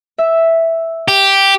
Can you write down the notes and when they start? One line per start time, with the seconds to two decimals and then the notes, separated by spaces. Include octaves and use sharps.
0.18 E5
1.08 G4